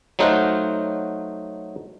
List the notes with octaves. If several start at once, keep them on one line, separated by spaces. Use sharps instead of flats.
F#3 A3 D#4 C5 F5 F#5